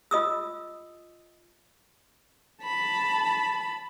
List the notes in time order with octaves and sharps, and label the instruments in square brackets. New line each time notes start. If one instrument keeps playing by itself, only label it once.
[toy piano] F4 D#5 D#6 E6
[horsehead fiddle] A5 [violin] B5